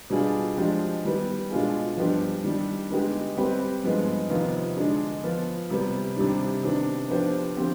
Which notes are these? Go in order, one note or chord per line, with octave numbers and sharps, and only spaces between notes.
B2 G3 D4 F4 G#4
F3 G#3 D4 G4
D#3 G3 B3
B2 G#3 D4 F4 G#4
G2 F3 B3 D4 G4
D#3 G3 D4
D3 G#3 B3 D#4 G4
G3 C4 G4 B4
G2 F3 G#3 B3
F2 C3 D#3 B3 F4
D3 G#3 D4
F3 B3 F4
C3 G3 B3
C3 D#3 G3 D4
C3 D#3 B3 D4
F3 B3 D4 G4 C5
D3 F3 C4 G4